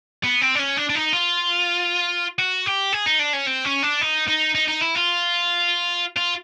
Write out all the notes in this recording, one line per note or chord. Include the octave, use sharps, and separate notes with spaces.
B3
C4
D4
C#4
D4
D4
D#4
F4
F#4
G4
G#4
D#4
D4
C#4
C4
C#4
D4
D#4
D#4
D#4
D#4
E4
F4
F4